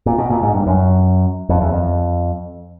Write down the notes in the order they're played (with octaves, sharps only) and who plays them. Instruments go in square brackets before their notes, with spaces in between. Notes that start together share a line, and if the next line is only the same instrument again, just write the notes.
[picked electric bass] A#2
B2
A#2
G#2
G2
F#2
F2
E2
F2